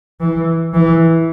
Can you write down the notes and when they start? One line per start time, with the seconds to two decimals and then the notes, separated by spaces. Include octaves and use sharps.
0.21 E3
0.74 E3